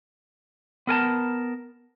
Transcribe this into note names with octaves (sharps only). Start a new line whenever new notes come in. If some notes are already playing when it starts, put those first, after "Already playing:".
B3 A#4 G#5 A5